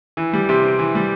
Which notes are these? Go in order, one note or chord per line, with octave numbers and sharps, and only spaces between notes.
E3
G3
C3
C4
E3
G3